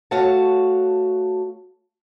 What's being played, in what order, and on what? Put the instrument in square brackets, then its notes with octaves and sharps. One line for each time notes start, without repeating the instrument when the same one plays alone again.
[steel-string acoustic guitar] A3 F#4 C#5 F5 A5